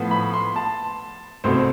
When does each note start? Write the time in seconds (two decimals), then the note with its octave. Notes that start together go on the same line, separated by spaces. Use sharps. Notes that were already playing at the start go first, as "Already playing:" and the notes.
Already playing: A2 F3 B3
0.11 B5
0.34 C6
0.56 A5
1.44 C2 B2 A3 C4 C5